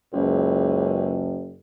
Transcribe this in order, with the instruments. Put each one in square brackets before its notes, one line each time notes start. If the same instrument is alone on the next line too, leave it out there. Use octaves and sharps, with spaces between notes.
[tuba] F#1 [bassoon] C#2